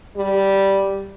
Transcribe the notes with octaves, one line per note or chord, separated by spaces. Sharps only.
G3